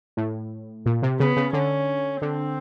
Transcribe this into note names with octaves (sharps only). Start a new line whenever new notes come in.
A2
A#2
C3
C#3 B3
C#3
D3 C#4
D3 C4